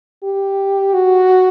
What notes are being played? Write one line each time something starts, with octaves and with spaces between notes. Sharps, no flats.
G4
F#4